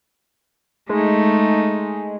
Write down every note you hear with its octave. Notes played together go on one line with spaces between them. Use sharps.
G#3 A3 D#4